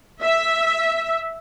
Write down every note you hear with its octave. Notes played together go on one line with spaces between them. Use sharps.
E5